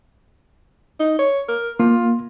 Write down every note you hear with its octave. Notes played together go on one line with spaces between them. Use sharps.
D#4
C#5
A#4
A#3 F4